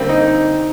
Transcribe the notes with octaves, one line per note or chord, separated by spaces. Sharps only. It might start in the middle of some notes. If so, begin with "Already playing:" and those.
Already playing: D3 G3 A#3 C4
D#4